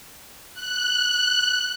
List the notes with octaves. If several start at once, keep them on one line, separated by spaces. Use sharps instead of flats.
F#6